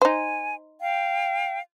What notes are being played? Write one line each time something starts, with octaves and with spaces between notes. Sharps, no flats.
D#4 C5 G#5
F5 G5